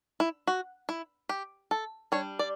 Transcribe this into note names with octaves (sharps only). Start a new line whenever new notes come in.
E4
F#4
E4
G4
A4
G3 D4 C#5
D5